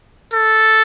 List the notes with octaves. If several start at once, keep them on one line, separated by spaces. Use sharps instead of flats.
A4